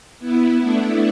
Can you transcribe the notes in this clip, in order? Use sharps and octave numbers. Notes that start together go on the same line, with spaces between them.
B3 E4
A3 D4